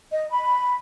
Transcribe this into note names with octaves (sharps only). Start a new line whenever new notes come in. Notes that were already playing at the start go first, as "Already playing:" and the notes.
D#5
B5